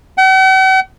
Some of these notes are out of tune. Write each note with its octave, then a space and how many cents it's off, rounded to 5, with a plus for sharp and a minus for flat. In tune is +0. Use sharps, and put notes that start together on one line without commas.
F#5 +45